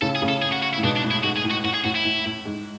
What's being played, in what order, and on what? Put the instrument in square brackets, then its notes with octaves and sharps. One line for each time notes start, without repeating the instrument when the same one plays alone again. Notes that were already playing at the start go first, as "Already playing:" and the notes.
[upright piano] A2 C#3 [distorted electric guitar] A4
[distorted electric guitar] G#4
[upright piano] A2 C#3
[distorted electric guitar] A4
G#4
F#4
F#4
E4
[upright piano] A2
[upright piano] G#2 B2 [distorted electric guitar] D4
[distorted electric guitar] D4
[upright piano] A2
[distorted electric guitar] E4
[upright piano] G#2 [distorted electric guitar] F#4
[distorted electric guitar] G#4
[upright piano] A2
[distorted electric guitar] F#4
[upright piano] A2 [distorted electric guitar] F#4
[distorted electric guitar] G#4
[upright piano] A2 [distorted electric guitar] F#4
[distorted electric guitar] E4
[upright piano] A2
A2
G#2